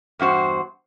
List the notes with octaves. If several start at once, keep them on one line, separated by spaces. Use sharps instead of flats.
E2 G2 F#4 C5